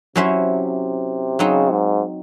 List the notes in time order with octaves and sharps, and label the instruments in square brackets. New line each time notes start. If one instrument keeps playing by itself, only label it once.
[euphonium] C3 [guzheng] F#3 C#4 E4 C5 E5
[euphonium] C#3 [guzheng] F#3 C4 D#4
[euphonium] G#2